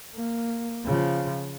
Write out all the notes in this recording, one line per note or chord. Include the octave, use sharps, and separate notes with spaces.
A#3
C#3 F3